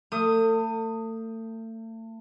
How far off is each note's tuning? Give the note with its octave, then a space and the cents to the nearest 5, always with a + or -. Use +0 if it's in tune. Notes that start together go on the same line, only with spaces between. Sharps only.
A3 +35 D#6 +0